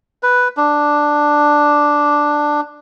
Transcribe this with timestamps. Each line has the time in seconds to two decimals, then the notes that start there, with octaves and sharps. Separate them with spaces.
0.23 B4
0.57 D4